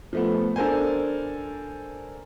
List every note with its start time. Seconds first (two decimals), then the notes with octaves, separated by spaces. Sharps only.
0.13 F3 A3 B3
0.56 D4 A4 A#4 C5 G#5